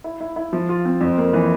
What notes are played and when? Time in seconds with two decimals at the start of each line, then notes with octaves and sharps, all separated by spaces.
0.04 E4
0.21 E4
0.36 E4
0.53 F3
0.69 F4
0.85 C4
1.01 F2
1.17 A#3
1.33 E3